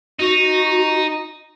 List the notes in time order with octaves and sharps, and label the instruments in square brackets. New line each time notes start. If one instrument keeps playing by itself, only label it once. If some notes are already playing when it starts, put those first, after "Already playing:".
[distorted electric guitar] D#4 [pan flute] F#4